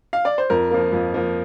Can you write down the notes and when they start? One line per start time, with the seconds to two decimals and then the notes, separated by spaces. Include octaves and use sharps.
0.13 F5
0.25 D5
0.38 C5
0.50 F2 A#4
0.71 F3 A#3
0.92 F2
1.14 F3 A#3